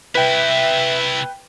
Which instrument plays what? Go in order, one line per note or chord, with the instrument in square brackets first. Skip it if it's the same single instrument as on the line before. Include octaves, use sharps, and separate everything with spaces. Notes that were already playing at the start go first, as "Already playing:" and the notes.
[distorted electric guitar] C3 E4 [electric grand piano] B4 G5 [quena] E5